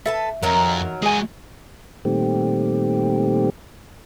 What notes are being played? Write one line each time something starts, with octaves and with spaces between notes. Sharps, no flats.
A4 B4 E5 A5
F2 D#3 F#3 A#4
G#3 F#4 G#4 G#5
A#2 D#3 G3 A3 C4 G4